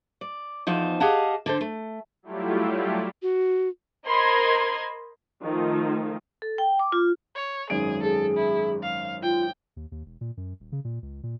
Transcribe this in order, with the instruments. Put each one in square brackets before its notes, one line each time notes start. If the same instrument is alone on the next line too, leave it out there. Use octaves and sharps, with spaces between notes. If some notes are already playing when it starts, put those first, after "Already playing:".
[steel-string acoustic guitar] D5
E2 F3 D#4 C5
G4 G#4 D#5 F5 F#5 A5
D3 A4 C5
A3
[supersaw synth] F#3 G3 A3 E4 F4 G4
[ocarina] F#4
[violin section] A#4 C5 D#5 B5 C6 G#6
[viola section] D#3 F3 A3 D#4 F4
[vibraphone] A4
G5
D6
F4
[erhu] C#5
[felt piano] G#1 F#2 D7 [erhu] G#4
[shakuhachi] G#4 [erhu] A4
[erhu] E4
F5
[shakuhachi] F4 [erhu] G5
[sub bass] D#2
D#2
E1
A#2
F#2
D#1
C#3
A#2
C#2
A#2